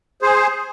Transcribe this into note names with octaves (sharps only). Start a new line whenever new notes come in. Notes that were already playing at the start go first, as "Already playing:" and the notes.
G#4 C5